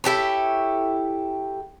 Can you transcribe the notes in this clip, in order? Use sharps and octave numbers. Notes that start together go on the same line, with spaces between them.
E4 G4 A4 C#5